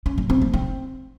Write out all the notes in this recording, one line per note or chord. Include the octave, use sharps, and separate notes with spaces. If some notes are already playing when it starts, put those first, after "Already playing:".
C#4
F#3
C4
F3
C4